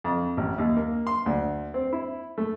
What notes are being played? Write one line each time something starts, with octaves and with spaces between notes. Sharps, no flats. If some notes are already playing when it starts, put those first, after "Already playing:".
F2
A1
D#2
A#3
C6
D2
C4
E4
A3